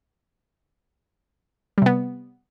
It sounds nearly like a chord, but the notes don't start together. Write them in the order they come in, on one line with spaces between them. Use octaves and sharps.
G3 C3 B3